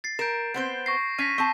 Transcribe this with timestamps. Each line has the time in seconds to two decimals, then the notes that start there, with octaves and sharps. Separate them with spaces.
0.04 A6 C7
0.19 A#4 G6 D7 E7
0.54 B3 C4 C5
0.86 C#6 A#6 C7
1.19 C#4 A#6 B6 D#7
1.38 C4 A5 C#6